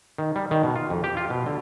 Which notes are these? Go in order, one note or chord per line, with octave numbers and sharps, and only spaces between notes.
D#3
G3
D#3
B2
F4
F2
G4
F4
B2
D3